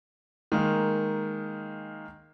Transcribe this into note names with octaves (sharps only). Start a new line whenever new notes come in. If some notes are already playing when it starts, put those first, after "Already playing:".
D#3 G#3 A#3